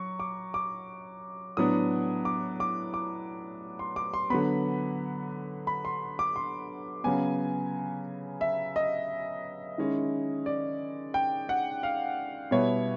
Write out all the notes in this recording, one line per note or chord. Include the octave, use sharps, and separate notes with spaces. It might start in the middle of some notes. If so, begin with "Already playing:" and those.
Already playing: F#3 C#6
D6
D6
A2 F#3 B3 D4 D#6
D6
D6
D6
C6
D6
C6
D3 F#3 B3 B5
B5
C6
D6
C6
C#3 F#3 B3 G#5
E5
D#5
D#3 G#3 C#4 E4
D5
G5
F#5
F5
B2 G3 B3 E4 C#5